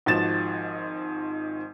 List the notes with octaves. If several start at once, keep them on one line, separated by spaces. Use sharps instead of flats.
G#1 G#2 F3 F#4 A6 E7